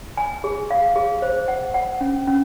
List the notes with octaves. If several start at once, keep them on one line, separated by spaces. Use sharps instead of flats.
G#5
G#4
F5
G#4
C5
F#5
F#5
C#4
C#4